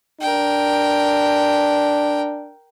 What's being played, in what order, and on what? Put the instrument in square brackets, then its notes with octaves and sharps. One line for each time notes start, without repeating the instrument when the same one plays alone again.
[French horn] D4 [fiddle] A#4 G5